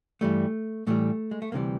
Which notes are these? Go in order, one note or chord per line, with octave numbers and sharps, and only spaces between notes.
G2 E3 G3 A3
A2 E3 G3 A3
G#3
A3
D2 C3 E3 G3 A#3